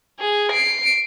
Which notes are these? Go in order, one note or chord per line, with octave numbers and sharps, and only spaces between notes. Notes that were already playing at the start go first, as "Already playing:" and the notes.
G#4
C7 D7